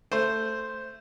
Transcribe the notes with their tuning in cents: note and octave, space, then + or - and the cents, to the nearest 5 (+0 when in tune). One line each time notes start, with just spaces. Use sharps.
A3 +10 C5 +0